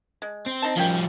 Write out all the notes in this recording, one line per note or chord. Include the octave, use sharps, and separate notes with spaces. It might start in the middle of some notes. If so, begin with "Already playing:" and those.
G#3
C4
D#4 A5
D#3 F3 G3 C#4 G5